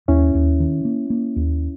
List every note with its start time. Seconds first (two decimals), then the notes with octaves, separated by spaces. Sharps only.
0.08 D#2 C#4 E4
0.35 D#2
0.60 D#3
0.85 A#3
1.10 A#3
1.36 D#2